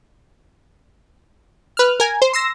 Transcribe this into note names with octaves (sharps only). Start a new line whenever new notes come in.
B4 F6
A#4 G#5
C5
C6 E6 A#6